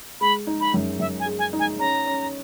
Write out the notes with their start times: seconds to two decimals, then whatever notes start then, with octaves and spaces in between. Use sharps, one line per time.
0.21 G#3 B5
0.47 D#4
0.60 B5
0.74 F#2
0.99 F#2 E5
1.20 G#5
1.26 G#3
1.39 G#5
1.53 D#4
1.59 G#5
1.79 C#4 A#5
2.06 C#4